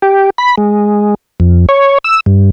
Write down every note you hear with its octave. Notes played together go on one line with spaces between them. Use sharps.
G4
B5
G#3
F2
C#5
E6
G2